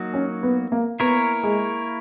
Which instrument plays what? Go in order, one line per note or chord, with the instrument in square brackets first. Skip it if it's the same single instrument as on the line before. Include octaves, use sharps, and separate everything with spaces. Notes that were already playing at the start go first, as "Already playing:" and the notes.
Already playing: [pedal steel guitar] F#3 A#3 D#4 F#4
[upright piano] C#4
B3
A#3
[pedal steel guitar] A#3 E4 A#4 C#5 [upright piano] B3
[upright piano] G#3